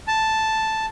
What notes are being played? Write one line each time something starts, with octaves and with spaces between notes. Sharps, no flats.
A5